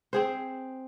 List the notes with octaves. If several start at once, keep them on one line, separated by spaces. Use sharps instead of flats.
C4 G#4 C5